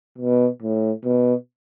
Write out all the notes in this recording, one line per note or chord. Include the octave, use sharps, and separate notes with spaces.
B2
A2
B2